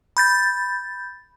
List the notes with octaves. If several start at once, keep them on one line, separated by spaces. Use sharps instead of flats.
B5 G6 A6